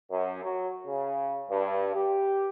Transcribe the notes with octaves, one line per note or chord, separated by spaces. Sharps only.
F#2
F#3
C#3
G2
G4